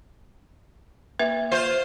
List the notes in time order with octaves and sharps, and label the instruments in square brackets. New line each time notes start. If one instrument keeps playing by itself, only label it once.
[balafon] A#3 B4 E5
[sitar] F4 C5